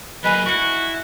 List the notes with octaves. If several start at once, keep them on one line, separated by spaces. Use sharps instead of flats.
F#3 A#3 B4 D#5 G#5 D#7
E4 F#4 C#6 C#7